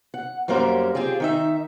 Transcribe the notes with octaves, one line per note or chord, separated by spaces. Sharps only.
F#5
F#2 G3 A#3 C#4 A#4 C5
C4 F4 G4 G#4
D#3 D#4 E5